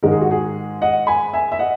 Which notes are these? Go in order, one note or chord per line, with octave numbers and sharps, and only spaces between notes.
G#2 D#3 G#3 D#4 A#4
G#4
F#4
G#4
D#5 F#5
G#5 B5
E5 G#5
E5
D#5 F#5